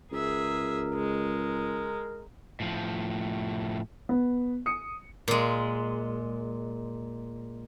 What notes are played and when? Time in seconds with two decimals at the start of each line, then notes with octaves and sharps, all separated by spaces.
0.12 C#2 G#4 A#4 E5
0.94 G#3
2.60 A2 F3
4.09 B3
4.66 D#6 C#7
5.28 A#2 G#3